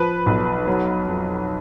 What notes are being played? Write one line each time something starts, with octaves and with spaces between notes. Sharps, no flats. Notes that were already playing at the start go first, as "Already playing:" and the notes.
Already playing: F3 B4
B1
F#3
F2